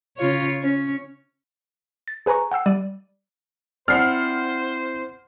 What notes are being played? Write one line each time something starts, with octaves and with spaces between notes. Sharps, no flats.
C#3 F4 C#5
C#4
A6
G#4 B4 G#5 A#5 C#6
F#5 G5 E6 C7
G3 D5 D#7
C4 E4 C5 D5 F#5 F6 C7